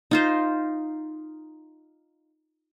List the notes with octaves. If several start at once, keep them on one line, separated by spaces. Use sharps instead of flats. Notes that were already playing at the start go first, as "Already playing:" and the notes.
D#4 F4 C5